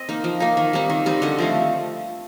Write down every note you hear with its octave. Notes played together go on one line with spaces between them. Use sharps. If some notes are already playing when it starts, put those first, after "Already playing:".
Already playing: C4 D#5
A#3 D#4
F3
A#3 D#4
D#3
G3 C4 D#4
D#3
G3 C4 D#4
D3 D#5
F3 A3 C4